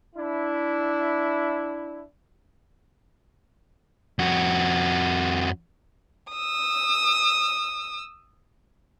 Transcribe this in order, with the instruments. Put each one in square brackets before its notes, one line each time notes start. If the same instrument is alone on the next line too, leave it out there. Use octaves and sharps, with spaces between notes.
[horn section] D4 E4
[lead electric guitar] F2 F#4
[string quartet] D#6 E6